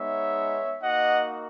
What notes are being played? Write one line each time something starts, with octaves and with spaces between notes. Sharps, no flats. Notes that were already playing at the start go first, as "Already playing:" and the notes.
Already playing: G#3 B3 D#4 C#5 E5
A#3 D#4 F#4 D#5 F#5